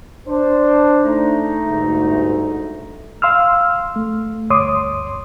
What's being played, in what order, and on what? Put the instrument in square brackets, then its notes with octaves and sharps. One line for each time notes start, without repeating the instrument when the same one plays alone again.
[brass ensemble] D4 C5
[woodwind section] A3 D#4
[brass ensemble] G1 D2 G#2
[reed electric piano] F5 C6 E6 F6
A3
D2 G2 C#5 C6 D6 D#6